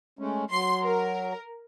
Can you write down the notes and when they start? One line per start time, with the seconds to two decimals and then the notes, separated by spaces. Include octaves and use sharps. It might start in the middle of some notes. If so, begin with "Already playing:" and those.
0.19 G#3 A3 C#4
0.51 F#3 C6
0.84 A#4